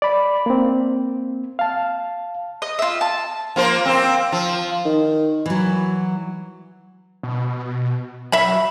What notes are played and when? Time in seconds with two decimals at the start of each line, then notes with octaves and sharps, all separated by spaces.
0.02 D5 B5
0.46 A#3 C4
1.59 F5 A5
2.62 D#5
2.79 F4 E5
3.01 A5
3.56 F3 A#3 C5
3.86 A#3 C4
4.32 F3
4.85 D#3
5.46 E3 F#3
7.23 B2
8.32 F#3 E5 B5